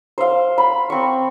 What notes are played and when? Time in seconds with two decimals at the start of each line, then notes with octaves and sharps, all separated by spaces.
0.18 C5 F5
0.58 B5
0.90 C4 C#6